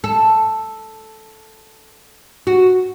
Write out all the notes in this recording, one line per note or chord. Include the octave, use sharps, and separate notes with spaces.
A4
F#4